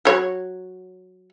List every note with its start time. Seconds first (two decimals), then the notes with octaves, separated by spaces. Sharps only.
0.05 F#3 C#5